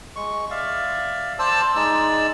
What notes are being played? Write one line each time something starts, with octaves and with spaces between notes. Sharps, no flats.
G#3 C#6
D5 E5 F5
C5 D5 A5 E6
G#3 D#4 D5 E6